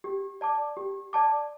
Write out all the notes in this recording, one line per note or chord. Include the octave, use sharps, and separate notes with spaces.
G4
D5 A5 D6
G4
D5 A5 D6